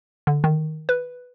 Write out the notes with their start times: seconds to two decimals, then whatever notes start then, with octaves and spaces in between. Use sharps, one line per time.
0.27 D3
0.44 D#3
0.89 B4